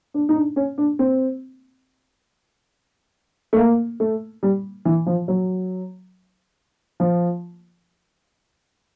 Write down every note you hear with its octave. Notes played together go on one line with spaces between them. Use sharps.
D4
D#4
D4
C#4
D4
C4
A3
A#3
A3
G3
E3
F3
F#3
F3